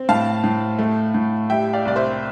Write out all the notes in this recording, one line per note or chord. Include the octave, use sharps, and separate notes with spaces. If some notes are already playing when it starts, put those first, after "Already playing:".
Already playing: C4
A2 F5 A5
A2
A3
A2
G3 E5 G5
D5 F5
C2 D5
C5 E5